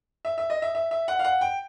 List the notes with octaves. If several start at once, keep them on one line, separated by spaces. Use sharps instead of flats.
E5
E5
D#5
E5
E5
E5
F#5
F5
F#5
G5